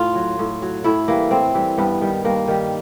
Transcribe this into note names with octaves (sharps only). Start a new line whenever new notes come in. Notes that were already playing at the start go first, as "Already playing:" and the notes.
Already playing: A2 F4
F#3
A2
F#3
A2 E4
E3 G3 A#3
A2 C4
E3 G3
G2 B3
D#3 G3
G2 A#3
D#3 G3